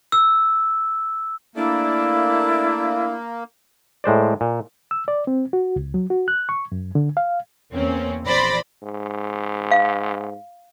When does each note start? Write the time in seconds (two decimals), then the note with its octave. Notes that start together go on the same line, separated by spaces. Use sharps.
0.12 E6
1.56 A3 A#3 D4 E4
4.04 A2 G#3 C5 D5
4.41 A#2
4.91 E6
5.08 D5
5.27 C4
5.53 F#4
5.76 C#2
5.94 F#3
6.10 F#4
6.28 F#6
6.49 C#6
6.72 F#2
6.95 D3
7.17 F5
7.72 E2 A#3 C4 C#4
8.25 A#1 E2 C5 D5 B5 A#6
8.83 G#2
9.71 F5